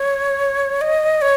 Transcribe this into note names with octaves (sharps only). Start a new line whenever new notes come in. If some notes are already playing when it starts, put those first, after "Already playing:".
Already playing: C#5
D#5
C#5